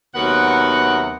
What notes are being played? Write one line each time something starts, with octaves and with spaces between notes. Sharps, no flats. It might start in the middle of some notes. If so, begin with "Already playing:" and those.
D#2 C3 F#3 B3 A#4 F#5